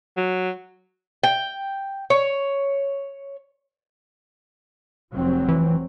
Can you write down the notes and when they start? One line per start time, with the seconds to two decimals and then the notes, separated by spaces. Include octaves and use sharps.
0.17 F#3
1.24 G5
2.10 C#5
5.13 F1 F#3 C4
5.48 E3